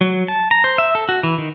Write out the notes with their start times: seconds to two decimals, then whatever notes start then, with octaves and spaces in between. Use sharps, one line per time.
0.01 F#3
0.28 A5
0.51 A#5
0.64 C5
0.78 E5
0.95 A4
1.09 F#4
1.23 E3
1.38 D#3